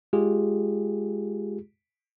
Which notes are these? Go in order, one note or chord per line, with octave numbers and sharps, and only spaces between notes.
G#3 F4 G4 G#4